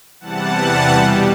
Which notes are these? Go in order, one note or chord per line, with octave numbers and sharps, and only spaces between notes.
E2 C3 E3 G3 F#5 A5
B2 G3